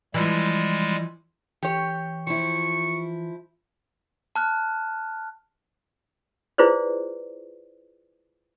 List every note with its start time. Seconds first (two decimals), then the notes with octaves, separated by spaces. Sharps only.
0.14 E3 F3 G3 G#3
1.63 E3 G4 C#5
2.27 F3 E4 C#6
4.36 A5 F6 F#6
6.58 E4 F4 G#4 B4 C5 D5